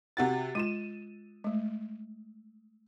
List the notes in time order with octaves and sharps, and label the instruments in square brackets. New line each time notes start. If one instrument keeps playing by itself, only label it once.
[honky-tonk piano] C3 F#4 A6
[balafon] G#3 F4 [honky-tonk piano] D#7 E7
[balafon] G#3 A3